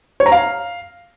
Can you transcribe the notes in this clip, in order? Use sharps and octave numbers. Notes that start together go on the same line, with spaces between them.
C#5
A#5
F5